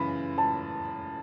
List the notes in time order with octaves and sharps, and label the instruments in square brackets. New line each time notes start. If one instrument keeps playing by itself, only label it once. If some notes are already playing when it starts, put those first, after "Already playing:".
Already playing: [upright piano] F#2 C#3 E3 [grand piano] B5
[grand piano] A5